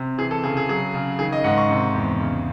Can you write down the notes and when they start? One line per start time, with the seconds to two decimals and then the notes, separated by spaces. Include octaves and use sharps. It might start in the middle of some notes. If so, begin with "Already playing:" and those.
Already playing: C3
0.18 E3 G#4
0.31 A4
0.43 C#3 G#4
0.57 G#4
0.69 F#3 G#4
0.94 C#3
1.19 D#3 G#4
1.32 D#5
1.44 G#2 F#5
1.58 C#6
1.70 C3
1.94 E2
2.20 C#3